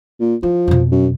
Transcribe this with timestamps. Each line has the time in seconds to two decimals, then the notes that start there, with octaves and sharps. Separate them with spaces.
0.20 A#2
0.43 F3 E4
0.68 F2 B2
0.91 F#2